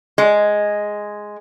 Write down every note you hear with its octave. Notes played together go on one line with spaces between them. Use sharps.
G#3